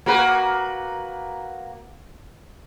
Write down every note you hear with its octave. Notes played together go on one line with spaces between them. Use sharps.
A#3 F#4 B4